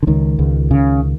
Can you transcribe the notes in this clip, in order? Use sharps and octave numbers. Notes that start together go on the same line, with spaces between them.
D3
C#2 D#3
C#2
C#3